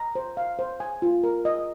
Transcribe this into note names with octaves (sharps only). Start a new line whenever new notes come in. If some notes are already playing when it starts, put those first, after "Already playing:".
Already playing: A#5
C5
F5
C5
G#5
F4
A#4
D#5